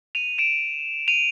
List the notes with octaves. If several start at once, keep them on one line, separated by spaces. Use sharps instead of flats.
D#7 F7
D7 E7
D#7 F7